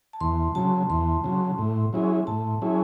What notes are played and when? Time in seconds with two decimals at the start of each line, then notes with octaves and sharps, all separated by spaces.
0.13 A5
0.21 E2 C6
0.55 C#3 F#3 A5
0.90 E2 C6
1.24 C#3 F#3
1.58 A2
1.93 F#3 C#4 E4 G#4
2.27 A2 A5
2.61 F#3 C#4 E4 G#4